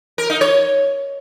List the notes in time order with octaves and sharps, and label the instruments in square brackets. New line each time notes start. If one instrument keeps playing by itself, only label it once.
[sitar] A#4
D#4
C#5